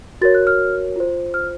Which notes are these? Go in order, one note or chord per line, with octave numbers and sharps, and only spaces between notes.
F#4 A#4 C#5 A6
F#6
F6
F4 C5
F6